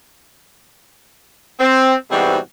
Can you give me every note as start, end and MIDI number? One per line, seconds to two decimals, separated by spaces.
1.60 1.95 60
2.11 2.37 44
2.11 2.37 47
2.11 2.37 52
2.11 2.37 55
2.11 2.37 60
2.11 2.37 66